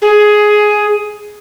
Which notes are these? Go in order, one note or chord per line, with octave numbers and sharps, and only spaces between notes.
G#4